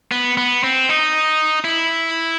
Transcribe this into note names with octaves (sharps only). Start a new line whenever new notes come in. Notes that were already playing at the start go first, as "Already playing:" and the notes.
B3
B3
C4
D#4
E4